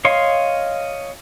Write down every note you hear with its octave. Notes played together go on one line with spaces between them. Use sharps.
C#5 D#5 F5 C6